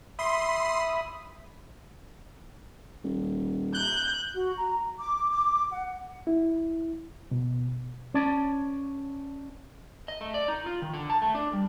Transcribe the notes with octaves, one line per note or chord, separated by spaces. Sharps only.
E5 B5 C6 D#6
D#1
F#6 G6
F#4
A#5
D6
D6
F#5
E4
B2
C#4 D5 A5
D#5
A3
D5
D#4
F4
D#3
D3
A5
A3
D4
G3